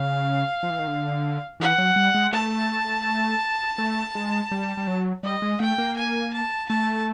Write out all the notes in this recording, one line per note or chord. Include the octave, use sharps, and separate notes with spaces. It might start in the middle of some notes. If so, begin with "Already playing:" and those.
Already playing: C#3 F5
F3
E3
D#3
D3
E3 F#5
F#3
G3
G#3
A3 A5
A3
G#3
G3
G3
F#3
G3 D#5
G#3
A3 G5
A#3
G#5
A5
A3 A5